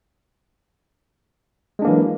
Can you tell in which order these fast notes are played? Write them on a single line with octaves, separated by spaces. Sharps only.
G#3 D4 A#3 E3 F#3